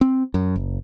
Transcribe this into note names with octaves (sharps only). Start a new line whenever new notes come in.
C4
F#2
F#1